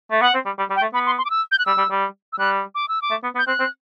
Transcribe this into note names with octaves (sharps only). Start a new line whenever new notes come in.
A3
B3 F#5
C4
G3
G3
G3
G5
A3
B3 B5
C6
C6
D6
E6
G6
F#6
G3 E6
G3
G3
E6
G3 F#6
D6
E6
D6
A3
B3
B3
G6
C4 F#6
C4